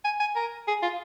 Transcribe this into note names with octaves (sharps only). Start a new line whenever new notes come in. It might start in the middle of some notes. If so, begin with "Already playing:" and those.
G#5
G#5
A#4
G#4
F4